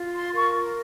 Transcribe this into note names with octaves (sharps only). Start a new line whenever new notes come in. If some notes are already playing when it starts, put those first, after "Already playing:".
Already playing: F4
C6
A#4 C#6